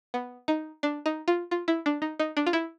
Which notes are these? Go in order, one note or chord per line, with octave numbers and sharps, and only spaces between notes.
B3
D#4
D4
D#4
F4
F4
E4
D4
D#4
D#4
D4
F4
E4